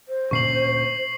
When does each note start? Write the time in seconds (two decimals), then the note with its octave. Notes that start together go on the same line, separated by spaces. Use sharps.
0.08 C5
0.31 D2 A#2 C#4 C#6 C7 F#7